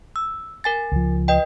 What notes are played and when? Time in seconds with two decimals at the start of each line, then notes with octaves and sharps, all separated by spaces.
0.16 E6
0.64 A#4 G#5 A6
0.92 C#2 F3
1.28 B4 D#5 G5